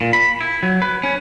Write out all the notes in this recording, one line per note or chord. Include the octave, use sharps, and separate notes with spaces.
A#2
B5
E4
F#3
B4
C#4